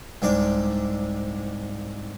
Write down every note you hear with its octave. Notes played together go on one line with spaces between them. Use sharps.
C2 G#2 D4 C5 D5